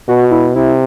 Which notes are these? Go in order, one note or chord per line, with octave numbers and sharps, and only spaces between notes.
B2 F#4
E4
C3 E4